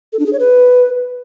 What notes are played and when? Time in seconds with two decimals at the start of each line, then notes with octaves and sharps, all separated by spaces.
0.13 A4
0.19 D4
0.26 G#4
0.33 C#5
0.40 B4